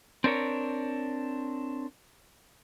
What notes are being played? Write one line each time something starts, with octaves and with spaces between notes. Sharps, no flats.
C4 D4 A#4 C#5